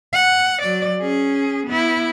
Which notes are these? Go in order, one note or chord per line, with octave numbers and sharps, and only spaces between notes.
F#5
F#3 D5
C#4 G#4
B3 E4